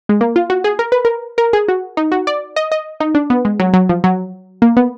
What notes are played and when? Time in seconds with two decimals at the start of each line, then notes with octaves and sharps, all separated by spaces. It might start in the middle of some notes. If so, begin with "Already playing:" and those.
0.09 G#3
0.21 A#3
0.36 F4
0.50 F#4
0.64 G#4
0.79 A#4
0.92 B4
1.05 A#4
1.38 A#4
1.53 G#4
1.68 F#4
1.97 D#4
2.12 F#4
2.27 D5
2.56 D#5
2.72 D#5
3.00 D#4
3.15 D4
3.30 B3
3.45 G#3
3.60 F#3
3.73 F#3
3.89 F3
4.04 F#3
4.62 A#3
4.77 B3